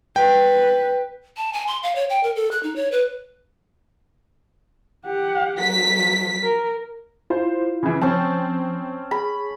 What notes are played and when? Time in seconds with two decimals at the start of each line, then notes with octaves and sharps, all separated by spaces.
0.16 B4 G5
1.37 A5
1.53 G#5
1.67 C6
1.83 F5
1.96 C#5
2.10 G5
2.23 A#4
2.36 A4
2.51 F#6
2.63 D#4
2.76 C#5
2.92 B4
5.06 G4 F#5
5.61 F#3 B6
6.43 A#4
7.30 E4 F4 C5
7.83 C#3 E3
8.01 F3 C4 C#4 A5
9.11 G#4 B5